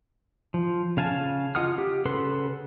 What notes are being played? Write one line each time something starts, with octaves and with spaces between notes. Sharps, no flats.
F3
C#3 F5 G#5 A5
F4 D#5 F#5 D#6 F6
G4
C#3 A4 B4 F#5 C6